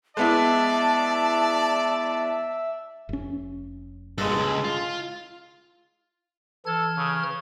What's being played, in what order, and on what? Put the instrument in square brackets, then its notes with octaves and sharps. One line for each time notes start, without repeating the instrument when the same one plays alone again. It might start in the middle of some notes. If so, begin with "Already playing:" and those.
[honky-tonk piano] G#3 B3 E4 [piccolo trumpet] D5 [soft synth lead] E5 [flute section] A5
[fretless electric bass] F1 C#4
[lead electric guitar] G2 A#2 [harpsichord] G#3 A4
[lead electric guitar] C#2 F#2
F4
[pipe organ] E3 F6 G#6 [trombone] A4
[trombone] C#3